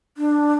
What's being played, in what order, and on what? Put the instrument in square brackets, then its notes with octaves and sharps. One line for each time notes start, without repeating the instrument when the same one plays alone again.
[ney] D4